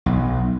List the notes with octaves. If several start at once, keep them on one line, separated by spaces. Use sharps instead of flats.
B1